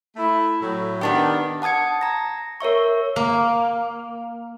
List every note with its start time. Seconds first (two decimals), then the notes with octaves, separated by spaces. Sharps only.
0.15 A3 E4
0.61 A2 F#3
1.01 D#3 B3 D4 G4
1.62 F#5 A5 D#6 G#6 C#7
2.01 A#5 A#6
2.60 A#4 C#5 E5 C#6
3.16 A#3